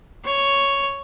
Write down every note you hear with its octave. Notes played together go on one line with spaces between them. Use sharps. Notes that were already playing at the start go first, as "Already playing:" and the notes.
C#5